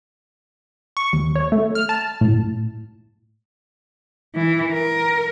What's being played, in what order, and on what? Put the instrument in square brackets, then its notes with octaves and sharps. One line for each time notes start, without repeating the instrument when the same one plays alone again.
[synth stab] C#6
D#2
C#5
A3
F6
A5
A2
[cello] E3
A#4